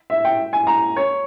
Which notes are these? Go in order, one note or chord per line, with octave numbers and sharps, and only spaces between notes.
E5
G5
G#5
A#5
C#5